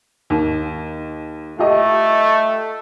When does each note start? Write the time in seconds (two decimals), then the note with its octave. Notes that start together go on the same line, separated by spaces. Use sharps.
0.30 D#2
1.59 A3 F4 G4 D#5